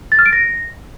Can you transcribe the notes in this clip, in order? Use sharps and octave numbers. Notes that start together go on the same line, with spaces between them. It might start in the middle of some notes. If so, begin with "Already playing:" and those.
A6
F6
D7
A#6